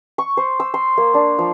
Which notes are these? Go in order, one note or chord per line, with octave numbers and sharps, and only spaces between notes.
C#6
C5
E6
C6
A#3
D4
F3